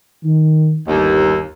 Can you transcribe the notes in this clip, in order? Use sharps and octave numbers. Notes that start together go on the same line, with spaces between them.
D#3
G1 D#2